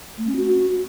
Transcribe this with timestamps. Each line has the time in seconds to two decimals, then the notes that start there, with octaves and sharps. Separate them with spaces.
0.18 A3
0.27 C#4
0.36 F#4